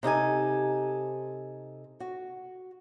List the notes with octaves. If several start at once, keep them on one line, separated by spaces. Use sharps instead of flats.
C3 D#4 A4 G#5
F#4